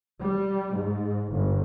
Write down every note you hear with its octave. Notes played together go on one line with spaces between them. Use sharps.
G3
G#2
G1